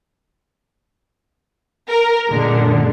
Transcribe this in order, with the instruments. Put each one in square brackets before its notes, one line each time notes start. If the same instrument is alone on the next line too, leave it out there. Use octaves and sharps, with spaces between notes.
[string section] A#4
F#2 A#2 D3 G#3